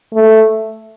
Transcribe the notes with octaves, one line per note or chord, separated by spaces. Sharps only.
A3